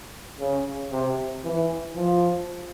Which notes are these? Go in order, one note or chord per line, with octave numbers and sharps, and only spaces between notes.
C#3
C3
E3
F3